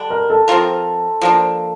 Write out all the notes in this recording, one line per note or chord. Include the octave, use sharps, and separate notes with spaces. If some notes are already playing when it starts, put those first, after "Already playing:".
Already playing: D3 G3 D4
A#4
A4
F3 C4 F4 A#4
F3 A#3 D4